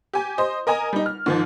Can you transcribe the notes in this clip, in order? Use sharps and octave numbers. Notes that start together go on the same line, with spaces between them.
G4 G#5
C5 D#5
A#4 D#5 G#5 A#5
G3 D#4
F6
G#2 D#3 F3